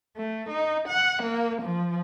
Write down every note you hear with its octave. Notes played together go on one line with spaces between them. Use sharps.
A3
D#4
F#5
A#3
F3